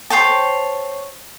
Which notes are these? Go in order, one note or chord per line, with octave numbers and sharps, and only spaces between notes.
C5 C#5 G5 A5